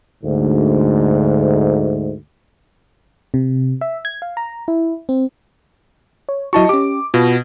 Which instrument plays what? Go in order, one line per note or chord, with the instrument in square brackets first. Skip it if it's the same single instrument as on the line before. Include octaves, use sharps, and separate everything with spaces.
[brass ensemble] D2 G#2
[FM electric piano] C3
E5
G#6
F5
A#5
E4
C4
C#5
[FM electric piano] F#3 E4 F#4 [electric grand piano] D#5 A5 C#6
[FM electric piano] C#4 G4 [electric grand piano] D6
[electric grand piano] B2 [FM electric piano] F4